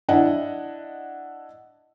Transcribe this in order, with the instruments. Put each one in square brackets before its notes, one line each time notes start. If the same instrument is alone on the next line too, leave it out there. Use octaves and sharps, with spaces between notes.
[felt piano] D4 E4 D#5 F#5